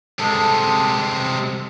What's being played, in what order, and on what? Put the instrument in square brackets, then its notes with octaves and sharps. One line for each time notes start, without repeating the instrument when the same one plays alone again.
[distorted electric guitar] C3 G#3 [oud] A4